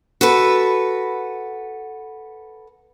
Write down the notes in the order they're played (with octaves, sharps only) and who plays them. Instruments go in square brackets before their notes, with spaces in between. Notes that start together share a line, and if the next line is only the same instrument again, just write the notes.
[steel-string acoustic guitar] F#4 A4 B4